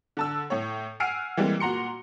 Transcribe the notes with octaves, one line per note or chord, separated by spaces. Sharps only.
D3 A5 E6
A2 C#5
F#5 G#5 E6 F6 C7 D7
E3 G3 G#3 A#3 C4
A#2 F#4 A#5 C6 C#7